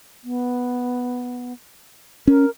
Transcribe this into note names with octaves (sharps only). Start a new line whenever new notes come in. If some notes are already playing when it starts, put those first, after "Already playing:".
B3
C#4 A#4